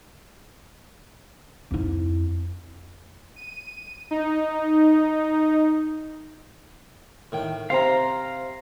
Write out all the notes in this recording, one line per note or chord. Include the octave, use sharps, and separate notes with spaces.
F2 E4
D#7
D#4
A2 D#3 G5
C3 C4 C5 F5 A#5